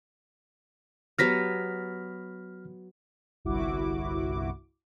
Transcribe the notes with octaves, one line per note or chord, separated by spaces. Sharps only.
F#3 B3 G4 F6 A#6 B6
G1 C2 E4 F#4 D6